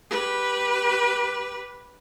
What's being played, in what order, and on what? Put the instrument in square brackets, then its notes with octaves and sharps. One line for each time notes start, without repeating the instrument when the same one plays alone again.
[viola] G4 B4